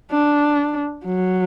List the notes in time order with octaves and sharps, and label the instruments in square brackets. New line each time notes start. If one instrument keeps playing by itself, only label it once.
[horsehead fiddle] D4
F#3